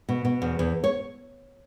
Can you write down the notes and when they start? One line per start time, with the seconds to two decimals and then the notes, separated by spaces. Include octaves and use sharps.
0.09 B2
0.25 B2
0.42 E2
0.59 E2
0.84 C#5